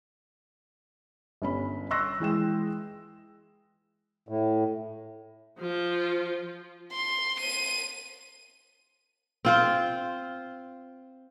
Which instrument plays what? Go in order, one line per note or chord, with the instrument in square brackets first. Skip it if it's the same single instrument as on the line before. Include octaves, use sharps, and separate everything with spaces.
[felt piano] G1 C#4 B5
C6 C#6 E6 F#6 A#6
E3 G#3 G5 E7
[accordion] A2
[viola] F3 F4
[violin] C6
D#7
[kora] C4 F4 C5